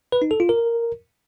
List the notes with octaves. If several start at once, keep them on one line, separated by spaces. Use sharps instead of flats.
B4
D#4
A4
F4
A#4